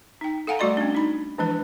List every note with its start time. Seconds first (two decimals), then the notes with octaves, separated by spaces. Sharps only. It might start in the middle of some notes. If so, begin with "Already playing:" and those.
0.21 D#4 G5
0.47 A4 F5 F#5 G#5 A#5
0.59 G3 A3 F#4 D5 D#5 C6
0.77 C#4 D4
0.95 D#4 B5
1.38 E3 F3 G#3 D4 E4 B4